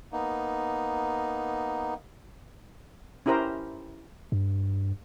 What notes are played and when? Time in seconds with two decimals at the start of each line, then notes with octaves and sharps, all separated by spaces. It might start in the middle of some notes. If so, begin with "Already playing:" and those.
0.12 A#3 B3 D#4
3.26 C#4 E4 G4 A#4 C5 A#5
4.32 G2